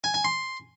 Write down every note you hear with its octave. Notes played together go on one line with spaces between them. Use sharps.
G#5
G#5
C6